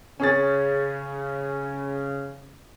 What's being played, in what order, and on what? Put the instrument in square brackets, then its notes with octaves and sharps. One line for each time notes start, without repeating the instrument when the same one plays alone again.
[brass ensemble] C#3 [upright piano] C#4 G#4 A6